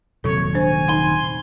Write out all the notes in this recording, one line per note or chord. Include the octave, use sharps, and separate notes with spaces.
D#1 C3 F#3 A4 C#5
D4 C5 G#5
D#4 C6